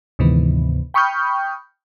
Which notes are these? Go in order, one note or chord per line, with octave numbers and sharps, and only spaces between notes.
D2 G#2 C3 D#3 E3 B3
G5 B5 C#6 D#6 F6 G6